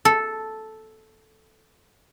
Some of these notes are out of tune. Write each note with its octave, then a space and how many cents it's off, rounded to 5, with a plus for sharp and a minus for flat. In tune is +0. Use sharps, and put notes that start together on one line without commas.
A4 -5